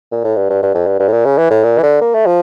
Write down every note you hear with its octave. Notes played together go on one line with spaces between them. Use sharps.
A#2
A2
G2
G2
G2
F2
G2
G2
A2
A#2
C#3
E3
A2
A#2
E3
D3
A#3
A3
F3